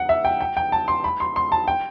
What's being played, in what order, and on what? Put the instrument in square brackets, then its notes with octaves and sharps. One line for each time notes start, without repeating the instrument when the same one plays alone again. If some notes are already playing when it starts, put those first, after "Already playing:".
Already playing: [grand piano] F#5
E5
G5
G5
G5
A5
C6
B5
C6
C6
A5
G5